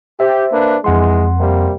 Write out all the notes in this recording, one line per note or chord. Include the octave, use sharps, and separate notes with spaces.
G4 C5 E5
A#3 D4 B4
F2 E3 G#3 F#5 C6
C3 G3 A#3